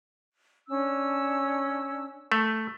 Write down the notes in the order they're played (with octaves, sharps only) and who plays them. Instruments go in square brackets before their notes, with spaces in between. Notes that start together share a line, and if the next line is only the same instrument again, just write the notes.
[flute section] C#4 D4 E6
[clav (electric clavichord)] A3